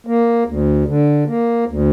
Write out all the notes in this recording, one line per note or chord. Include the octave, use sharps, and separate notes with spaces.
A#3
D2
D3
A#3
D2